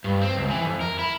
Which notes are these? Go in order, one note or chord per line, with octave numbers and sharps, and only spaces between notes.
G2
C4
C#2
E3
F2
A#4
E4